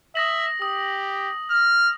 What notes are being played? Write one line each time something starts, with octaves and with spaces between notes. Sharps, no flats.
E5 D#6 A#6 F#7
G4 D#6
F6